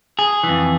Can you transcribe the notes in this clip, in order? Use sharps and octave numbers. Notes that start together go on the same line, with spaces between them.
G#4
F2 E3